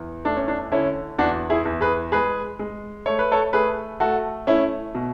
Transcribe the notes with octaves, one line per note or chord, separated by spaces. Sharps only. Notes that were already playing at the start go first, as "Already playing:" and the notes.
Already playing: E2
A3 D4
C#4
D4
D3 C#4 E4
E2 D4 F#4
E4 G#4
E2
G#4 B4
G#3 G#4 B4
G#3
A3 C#5
B4
A4 C#5
A3 G#4 B4
A3 F#4 A4
A3 C#4 E4
B2